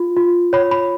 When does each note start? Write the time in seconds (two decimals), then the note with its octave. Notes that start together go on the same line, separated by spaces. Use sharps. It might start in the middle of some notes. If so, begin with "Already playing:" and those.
Already playing: F4
0.17 F4
0.53 C#5 B5
0.71 B5